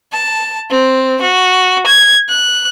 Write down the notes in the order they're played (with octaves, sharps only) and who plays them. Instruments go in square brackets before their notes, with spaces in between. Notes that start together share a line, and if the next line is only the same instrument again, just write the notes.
[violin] A5
C4
F#4
G#6
F#6